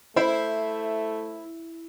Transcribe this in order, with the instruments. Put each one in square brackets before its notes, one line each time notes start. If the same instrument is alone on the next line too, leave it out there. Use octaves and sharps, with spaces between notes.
[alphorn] A3 [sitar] E4 [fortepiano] C5 B5